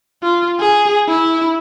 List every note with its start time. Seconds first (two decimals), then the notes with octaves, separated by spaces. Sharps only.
0.23 F4
0.60 G#4
1.08 E4